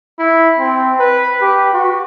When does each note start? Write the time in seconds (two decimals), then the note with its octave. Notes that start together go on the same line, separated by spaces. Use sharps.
0.19 E4
0.59 C4
0.99 B4
1.42 G4
1.73 F#4